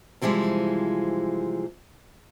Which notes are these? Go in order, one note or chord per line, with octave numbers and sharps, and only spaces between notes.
C3 E3 F3 G3 G#3